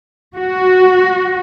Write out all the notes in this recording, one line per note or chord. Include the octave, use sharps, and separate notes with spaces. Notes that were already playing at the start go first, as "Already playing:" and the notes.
F#4